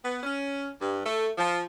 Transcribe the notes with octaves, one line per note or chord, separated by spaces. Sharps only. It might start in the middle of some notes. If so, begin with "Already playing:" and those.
B3
C#4
G2
A3
F3